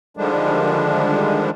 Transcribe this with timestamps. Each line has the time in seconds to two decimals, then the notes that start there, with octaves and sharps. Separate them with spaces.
0.17 D3 D#3 F3 G3 G#3 D4